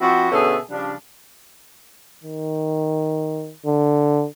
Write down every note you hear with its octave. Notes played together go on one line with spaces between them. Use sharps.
F3 C4 E4 F#4
B2 D3 C#4 G#4 A4 E5
C#3 F3 G3 D4
D#3
D3